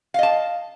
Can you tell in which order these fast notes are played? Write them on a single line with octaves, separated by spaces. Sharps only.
F5 D#5 A5